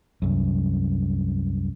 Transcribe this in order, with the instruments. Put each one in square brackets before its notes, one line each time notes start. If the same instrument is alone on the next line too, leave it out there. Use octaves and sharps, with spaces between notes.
[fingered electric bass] C2 F#2